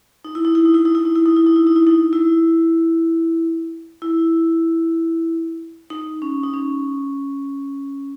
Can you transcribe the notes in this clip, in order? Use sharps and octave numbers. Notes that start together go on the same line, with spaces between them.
D#4
E4
D#4
E4
D#4
E4
D#4
E4
D#4
E4
D#4
E4
D#4
E4
D#4
E4
D#4
E4
E4
D#4
C#4
D#4
C#4